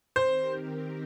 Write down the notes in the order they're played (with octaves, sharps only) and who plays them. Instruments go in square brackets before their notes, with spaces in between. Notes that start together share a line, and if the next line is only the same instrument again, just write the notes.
[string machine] D#3 C4 G4 A#4 [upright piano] C5